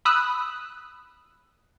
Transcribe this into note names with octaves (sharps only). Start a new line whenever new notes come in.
B5 D#6 E6 F#6